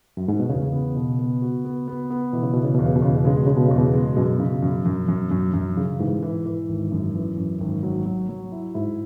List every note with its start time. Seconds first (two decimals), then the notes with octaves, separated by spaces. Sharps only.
0.17 F#2
0.28 G#2
0.40 B2
0.49 E2 C#3
0.73 B3
0.96 B2
1.19 B3
1.42 F#4
1.65 B3
1.88 B3
2.10 B3
2.33 B2 E3
2.43 C#3
2.53 B2 E3
2.64 C#3
2.75 E2 B2
2.86 C#3
2.96 B2
3.02 E2 C#3
3.17 B2
3.25 C#3 G#3
3.37 B2
3.47 C#3 G#3
3.57 B2
3.68 E2 C#3
3.78 B2
3.94 G#3
4.16 F#2 B2
4.40 C#3
4.63 F#2
4.85 F#2
5.08 F#2
5.31 F#2
5.54 F#2
5.77 C#3
5.99 G#2 E3
6.23 E3
6.46 E3
6.69 G#1
6.92 F#2
7.15 E3
7.37 F#2
7.61 G#1
7.83 F#3
8.06 F#3
8.29 F#3
8.52 E4
8.74 G#2 E4